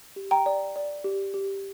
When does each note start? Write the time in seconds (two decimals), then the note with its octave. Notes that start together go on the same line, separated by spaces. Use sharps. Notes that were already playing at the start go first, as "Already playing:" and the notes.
0.16 G4
0.31 G5 A#5
0.46 D5
0.76 D5
1.04 G4
1.34 G4